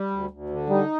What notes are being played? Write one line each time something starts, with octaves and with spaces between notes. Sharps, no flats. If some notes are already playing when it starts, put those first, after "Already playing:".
Already playing: G3
D2
D2
D3
G3 D#4